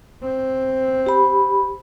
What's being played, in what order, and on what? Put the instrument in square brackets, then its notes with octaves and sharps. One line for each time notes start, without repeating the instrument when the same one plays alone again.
[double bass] C4
[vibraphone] G4 B5